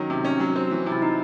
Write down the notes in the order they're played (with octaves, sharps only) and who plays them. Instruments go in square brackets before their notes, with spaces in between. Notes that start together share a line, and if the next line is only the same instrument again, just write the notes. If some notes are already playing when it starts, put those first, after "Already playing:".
Already playing: [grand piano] D#3 F#3 C#4
C3
C#4
F#3
C4
E3
C3
[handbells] E4
D#4